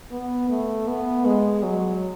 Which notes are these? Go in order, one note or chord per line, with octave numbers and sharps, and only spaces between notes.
B3
A3
B3
G#3
F#3